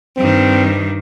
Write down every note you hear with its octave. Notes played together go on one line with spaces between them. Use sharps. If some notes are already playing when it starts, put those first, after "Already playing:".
G2 D#3 C4